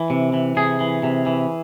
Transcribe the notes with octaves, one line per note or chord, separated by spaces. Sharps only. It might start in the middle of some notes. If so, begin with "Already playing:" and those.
Already playing: E3
C3
E3
C3 G#4
E3
C3
E3